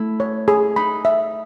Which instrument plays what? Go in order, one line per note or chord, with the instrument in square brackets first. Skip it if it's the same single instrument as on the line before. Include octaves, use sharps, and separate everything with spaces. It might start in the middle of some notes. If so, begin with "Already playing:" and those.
Already playing: [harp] A3 E4
[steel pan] C#5
G#4
[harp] D#4 [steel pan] B5
[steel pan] E5